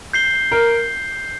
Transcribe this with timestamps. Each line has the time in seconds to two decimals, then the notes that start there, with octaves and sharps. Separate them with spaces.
0.13 G6 C7 G7
0.52 A#4